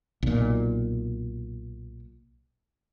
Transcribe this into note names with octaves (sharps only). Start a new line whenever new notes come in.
B1 A#2